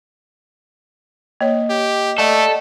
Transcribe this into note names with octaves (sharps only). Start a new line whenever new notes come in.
A#3 C#5 D#5
G4
A3 A4 D5 D#5 F#5